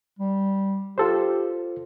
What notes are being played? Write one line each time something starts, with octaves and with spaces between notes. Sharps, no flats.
G3
F4 G4 A4 C5